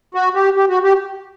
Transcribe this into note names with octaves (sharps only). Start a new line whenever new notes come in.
F#4
G4
G4
F#4
G4